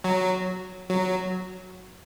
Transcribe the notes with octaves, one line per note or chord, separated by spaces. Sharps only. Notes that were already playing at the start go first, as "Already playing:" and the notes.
F#3
F#3